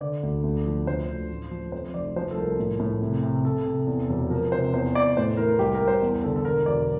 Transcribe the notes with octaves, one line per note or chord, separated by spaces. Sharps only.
D3 D5
D2
D2
F3
D2 C5
D2
A1
F3
F2 C5
F1 D5
F3 C5
A4
C2 A#4
A2
A2
C3
C3
C3 A4
C3
E2
E1
F3 A#4
C3 C5
E2 C5
E2 D5
A2 C5
E3 A#4
C2 G4
A#4
C2
C5
E2
D3 A4
A4
E1 A#4
E1 D5